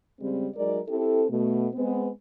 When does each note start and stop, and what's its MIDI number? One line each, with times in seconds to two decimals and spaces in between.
0.20 0.48 49
0.20 0.48 55
0.20 0.48 56
0.20 0.48 60
0.55 0.79 54
0.55 0.79 56
0.55 0.79 63
0.55 0.79 70
0.55 0.79 74
0.88 1.24 60
0.88 1.24 64
0.88 1.24 67
0.88 1.24 69
1.29 1.67 47
1.29 1.67 57
1.74 2.09 56
1.74 2.09 59
1.74 2.09 60